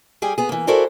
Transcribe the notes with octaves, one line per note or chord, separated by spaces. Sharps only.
G3 G4 G#4
B3 G#4
E3 A#3
E4 F#4 A4 A#4 C5 D5